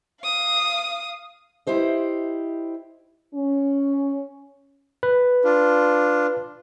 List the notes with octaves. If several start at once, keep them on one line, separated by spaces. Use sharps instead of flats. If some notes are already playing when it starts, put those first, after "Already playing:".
F5 D#6
E4 G4 C5 D#5
C#4
B4
D4 F4